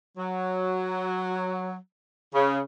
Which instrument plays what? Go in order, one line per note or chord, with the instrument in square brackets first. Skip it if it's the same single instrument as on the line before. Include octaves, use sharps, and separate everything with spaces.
[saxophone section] F#3
C#3